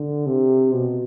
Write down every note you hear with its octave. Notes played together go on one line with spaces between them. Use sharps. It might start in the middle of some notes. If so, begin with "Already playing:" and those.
Already playing: D3
C3
B2